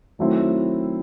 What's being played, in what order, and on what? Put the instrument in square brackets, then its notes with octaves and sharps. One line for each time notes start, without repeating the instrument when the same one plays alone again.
[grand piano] D#3 F#3 A3 C4 E4